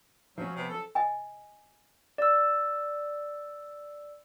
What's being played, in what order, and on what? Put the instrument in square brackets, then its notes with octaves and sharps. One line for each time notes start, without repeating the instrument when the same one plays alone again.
[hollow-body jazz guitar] F3 C#4 [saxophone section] F#3
[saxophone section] C3 B3
A4
[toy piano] D#5 G#5
[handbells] D5 E6